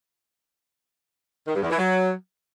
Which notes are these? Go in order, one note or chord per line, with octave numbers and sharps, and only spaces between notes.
D#3
G2
E2
E3
F#3